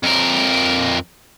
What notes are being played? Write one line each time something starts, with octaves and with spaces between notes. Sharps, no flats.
F2 A#4